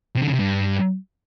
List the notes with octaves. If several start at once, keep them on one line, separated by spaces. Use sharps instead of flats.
C3
D3
C#3
C3
G2